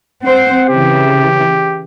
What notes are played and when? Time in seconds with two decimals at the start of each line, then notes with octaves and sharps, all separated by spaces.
0.23 C4 C5 F#5
0.69 C#3 E3 G4